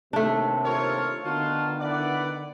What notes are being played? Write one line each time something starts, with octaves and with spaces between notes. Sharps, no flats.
D#2 C3 A3 D4
F4 A4 A#4 C#5
D3 D#3 B3 D#4 F4 F#4 A5
E4 B4 D5 F#5